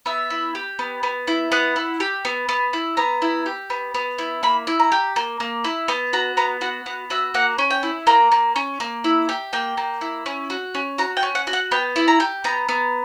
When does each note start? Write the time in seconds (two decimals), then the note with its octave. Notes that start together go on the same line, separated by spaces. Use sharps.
0.06 B3 E5
0.30 E4
0.55 G4
0.79 B3
1.03 B3
1.27 E4
1.52 B3 F#5
1.76 E4
2.00 G4
2.25 B3
2.49 B3
2.73 E4
2.97 B3 A#5
3.22 E4
3.46 G4
3.70 B3
3.94 B3
4.18 E4
4.43 A#3 B5
4.67 E4
4.80 A#5
4.92 G4
5.16 A#3
5.40 A#3
5.64 E4
5.88 B3 G5
6.13 F#4 A#5
6.37 B3 A#5
6.61 F#4 F#5
6.86 B3 F#5
7.10 F#4 E5
7.34 A#3 F#5
7.58 C#4
7.70 G5
7.83 E4
8.07 A#3 A#5
8.32 A#3
8.56 C#4
8.80 A#3
9.04 E4
9.29 G4
9.53 A#3 G5
9.77 A#3
10.01 E4
10.26 C#4
10.50 F#4
10.75 C#4
10.98 F#4 A#5
11.17 G5
11.23 C#4
11.35 F#5
11.47 F#4
11.53 F#5
11.71 B3 G5
11.96 E4
12.08 A#5
12.20 G4
12.44 B3 A#5
12.69 B3